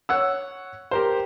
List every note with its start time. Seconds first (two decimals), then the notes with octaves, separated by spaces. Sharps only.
0.09 C#5 F#5 E6
0.91 G4 A#4 C5